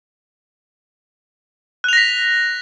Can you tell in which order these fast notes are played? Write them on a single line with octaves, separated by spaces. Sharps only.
F#6 F7 A#6 B6